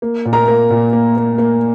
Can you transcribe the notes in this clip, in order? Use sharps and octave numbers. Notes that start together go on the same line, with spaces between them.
A#3
A#2
A#4 A#5
A#3
A#2
A#3
A#3
A#3